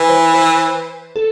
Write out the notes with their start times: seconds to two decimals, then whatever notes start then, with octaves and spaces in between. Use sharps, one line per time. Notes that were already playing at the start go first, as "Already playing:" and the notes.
Already playing: E3 B4
0.09 C5
0.34 C5
1.16 A4